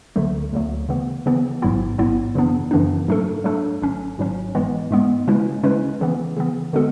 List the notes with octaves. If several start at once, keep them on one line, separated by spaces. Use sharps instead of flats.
D2 D3 F#3 A3
D2 D3 F#3 A3
C#3 E3 B3
C#3 E3 B3
A1 G#2 F#3 B3 E4
A1 G#2 F#3 B3 E4
F#2 C#3 E3 B3 D4
F#2 C#3 E3 B3 D4
G#2 F#3 A3 D4 A4
G#2 F#3 A3 D4 A4
G#1 G#2 F#3 C#4
G#1 G#2 F#3 C#4
G#2 E3 G#3 B3
G#2 E3 G#3 B3
C#3 G#3 C#4 E4 B4
C#3 G#3 C#4 E4 B4
C#3 E3 B3
C#3 E3 B3
D3 G#3 B3 F#4 A4